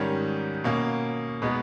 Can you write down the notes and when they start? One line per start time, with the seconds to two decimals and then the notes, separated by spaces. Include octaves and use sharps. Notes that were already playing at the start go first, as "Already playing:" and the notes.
Already playing: G#2 D#3 G3 C#4
0.64 B2 A#3 C#4
1.42 B2 G#3 B3 D#4